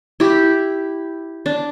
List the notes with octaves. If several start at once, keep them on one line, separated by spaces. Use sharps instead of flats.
E4 G4
D4